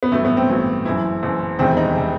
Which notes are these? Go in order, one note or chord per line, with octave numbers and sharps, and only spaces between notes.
B3
A1 G2 F#3 A3
B3
C4
A1 G2 F#3
F#1 F#2 E3 E4
F#1 F#2 E3
E1 E2 C3 D#3 G3 C4
D#4
C3 D#3 G3